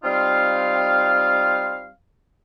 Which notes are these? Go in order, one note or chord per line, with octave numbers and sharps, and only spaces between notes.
G3 C4 D#4 F4 F5